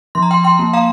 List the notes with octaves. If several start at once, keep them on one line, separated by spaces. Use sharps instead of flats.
F3 C6
A#5
G5 C6
G5 C6
A#3
F5 A#5